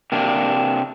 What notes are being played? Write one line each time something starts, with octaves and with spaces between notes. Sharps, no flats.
C3 A#3 D4